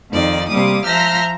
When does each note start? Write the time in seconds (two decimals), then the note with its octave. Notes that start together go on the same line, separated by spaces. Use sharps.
0.11 F2 D#3 D#4 D5
0.49 C3 G3 A#3 D6 D#6
0.86 F3 E5 A#5 F6 G6 A#6